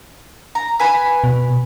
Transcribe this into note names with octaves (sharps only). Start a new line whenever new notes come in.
A#5
B4 G#5 B5
B2